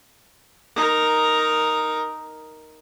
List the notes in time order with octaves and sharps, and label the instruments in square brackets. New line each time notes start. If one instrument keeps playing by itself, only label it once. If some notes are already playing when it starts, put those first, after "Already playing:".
[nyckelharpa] D#4 A#4